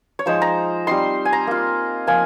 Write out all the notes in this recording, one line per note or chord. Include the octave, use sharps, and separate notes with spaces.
C#5
F3 G#3 D#4 C5
A#5
G3 C4 D#4 C6
G#5
A#5
A#3 F4
F3 A#3 F4 G#5